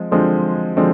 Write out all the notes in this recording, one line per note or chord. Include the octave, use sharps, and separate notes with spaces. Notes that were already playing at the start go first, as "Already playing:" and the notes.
Already playing: F3 G#3 C4
D3 F3 G#3 C4
D3 F3 G#3 C4